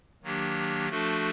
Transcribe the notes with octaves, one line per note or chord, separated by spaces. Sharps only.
D#3 F#3 A#3 D4 G4
F3 A3 D4 F#4 A4